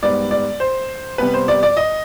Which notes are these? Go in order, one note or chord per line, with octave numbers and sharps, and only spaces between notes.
G#2 G3 B3 D5
D5
C5
C3 G3 B3 B4
C5
D5
D5
D#5